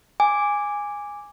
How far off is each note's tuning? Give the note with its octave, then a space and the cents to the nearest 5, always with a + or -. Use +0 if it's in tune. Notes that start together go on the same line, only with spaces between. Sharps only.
G#5 -10 D6 +0